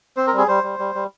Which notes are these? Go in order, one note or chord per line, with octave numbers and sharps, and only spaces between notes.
C4 C5
A#4
G3
G#4
G3 C5
G3
G3
G3